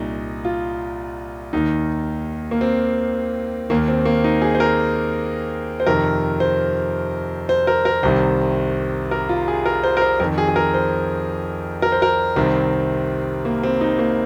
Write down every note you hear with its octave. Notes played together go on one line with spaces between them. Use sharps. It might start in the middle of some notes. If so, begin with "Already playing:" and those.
Already playing: C2 A#2 D#4
F4
D#2 D#3 D#4
A#3
C4
D#2 D#3 A#3
C4
A#3
D#4
G#4
C5
A#4
C5
F2 C3 D#3 A#4
C5
C5
A#4
A#4
C2 C3 D#3 C5
A#4
F4
G#4
A#4
C5
A#4
C5
F2 D#3 A#4
G#4
G#4
A#4
C5
A#4
C5
A#4
C2 C3 D#3 C4
A#3
C4
D#4
A#3